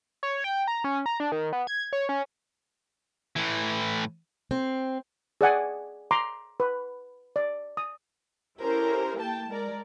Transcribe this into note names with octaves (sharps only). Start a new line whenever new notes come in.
C#5
G5
A#5
C#4
A#5
D4
D#3
B3
G#6
C#5
C#4
A2 E3
C4
G#4 D5 F#5 G#5
A#5 C6 D6
B4
D5
D#6
C#4 E4 G4 A4 A#4 C5
A#3 G5 A5
G#3 A#4 D5